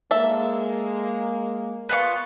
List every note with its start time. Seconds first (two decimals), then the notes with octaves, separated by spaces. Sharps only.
0.11 G#3 A#3 A4 E5
1.89 B3 F4 C#6